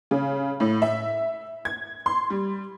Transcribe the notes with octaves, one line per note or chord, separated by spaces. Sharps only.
C#3
A2
E5
G#6
C6
G3